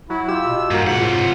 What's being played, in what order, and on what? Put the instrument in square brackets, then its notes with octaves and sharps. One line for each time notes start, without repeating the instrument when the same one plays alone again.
[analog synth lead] F#3 [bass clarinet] E4
[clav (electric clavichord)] F4 G4 [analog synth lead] E6
[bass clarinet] B2
[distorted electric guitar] G2 [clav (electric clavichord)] A#3 F#4 A#4
[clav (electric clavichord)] G#2 [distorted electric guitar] C3 F#5 [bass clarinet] F4
[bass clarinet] A2 [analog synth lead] F4